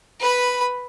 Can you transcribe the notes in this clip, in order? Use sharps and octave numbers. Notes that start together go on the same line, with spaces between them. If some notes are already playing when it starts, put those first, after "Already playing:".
B4 B5